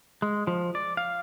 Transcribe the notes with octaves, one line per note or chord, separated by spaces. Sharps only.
G#3
F3
D5
F5